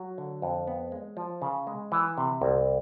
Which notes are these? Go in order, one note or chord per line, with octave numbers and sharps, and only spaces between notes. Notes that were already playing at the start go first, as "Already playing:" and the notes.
Already playing: F#3
D3
F2
B3
G#3
F3
C#3
G#3
E3
C3
C2